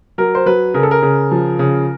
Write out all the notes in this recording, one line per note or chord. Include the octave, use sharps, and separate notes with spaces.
F#3 A#4
C5
F#3 B4
C#3 A#4
A4
A#4
C#3
F3
C#3